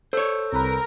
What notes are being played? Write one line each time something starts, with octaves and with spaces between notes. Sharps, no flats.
A4 C5 C#5 E6 G6
C2 A#4 B4